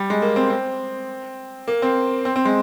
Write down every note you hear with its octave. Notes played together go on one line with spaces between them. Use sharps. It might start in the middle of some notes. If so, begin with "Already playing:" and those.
Already playing: G3
G#3
A#3
C4
C4
A#3
C4
C4
C4
G#3